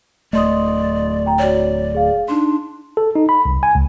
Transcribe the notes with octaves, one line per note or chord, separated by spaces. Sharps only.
D1 A3 D5 D#5 C6 D#6
G5 A#5
F#4 C#5 D5
G#4 F5
D4 D#4 C6
A4
D#4
B5
C2
G#5
C#2